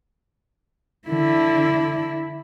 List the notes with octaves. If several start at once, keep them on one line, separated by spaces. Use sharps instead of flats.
D3 E4